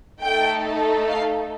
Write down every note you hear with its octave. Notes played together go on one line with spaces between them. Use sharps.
A3 D#4 A4 G5
F5